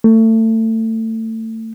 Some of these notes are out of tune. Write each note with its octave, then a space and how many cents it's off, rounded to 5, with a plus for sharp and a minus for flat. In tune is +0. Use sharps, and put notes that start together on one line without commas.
A3 +25